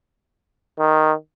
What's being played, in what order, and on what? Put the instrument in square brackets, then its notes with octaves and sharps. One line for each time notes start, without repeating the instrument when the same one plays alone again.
[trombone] D#3